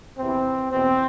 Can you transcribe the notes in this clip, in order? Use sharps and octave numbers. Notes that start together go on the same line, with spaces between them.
E2 C3 E3 C4
E2 B2 C4